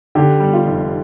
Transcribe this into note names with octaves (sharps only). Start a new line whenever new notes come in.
D3 G4
G3
F4
F1